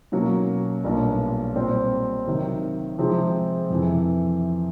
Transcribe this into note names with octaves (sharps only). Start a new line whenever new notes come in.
B2 F#3 A#3 C#4 F#4
B1 A#2 G3 A#3 D4
A#2 G3 C4
C3 D#3 F#3
C3 F3 G#3 C4
F2 C3 E3